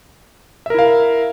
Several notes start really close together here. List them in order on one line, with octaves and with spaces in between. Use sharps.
E5 A#4 E4 F5